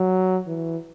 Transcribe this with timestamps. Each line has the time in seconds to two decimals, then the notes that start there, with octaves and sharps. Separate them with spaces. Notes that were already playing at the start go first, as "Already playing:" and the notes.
Already playing: F#3
0.47 E3